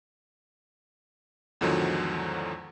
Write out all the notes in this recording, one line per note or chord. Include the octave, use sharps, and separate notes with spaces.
E2 G#2 D3 D#3 F3 F#3